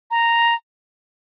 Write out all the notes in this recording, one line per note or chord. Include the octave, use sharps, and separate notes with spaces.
A#5